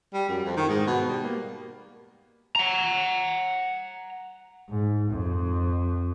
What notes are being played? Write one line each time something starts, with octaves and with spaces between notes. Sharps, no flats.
G3
F#2
F2
D#3
G#2
B2
G3
A#3
F#5 A#5
G#2
F2